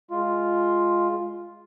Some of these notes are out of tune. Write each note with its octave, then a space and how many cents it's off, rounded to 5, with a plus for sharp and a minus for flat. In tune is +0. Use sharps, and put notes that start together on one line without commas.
G#3 +0 F4 +0